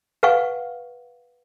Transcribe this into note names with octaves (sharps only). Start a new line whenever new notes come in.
B4 F5 F#5 G#5 C#6